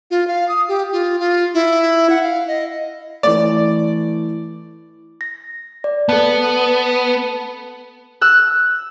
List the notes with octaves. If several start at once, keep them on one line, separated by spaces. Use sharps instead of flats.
F4
F5
D#6
G4
F4
F4
E4
F#5
F5
D#5
E3 A3 D5
A#6
D5
B3 A4 A5
E6 F#6